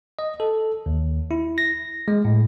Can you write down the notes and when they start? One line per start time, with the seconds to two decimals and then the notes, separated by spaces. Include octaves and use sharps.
0.19 D#5
0.40 A4
0.86 D#2
1.31 E4
1.58 A#6
2.08 G#3
2.25 A2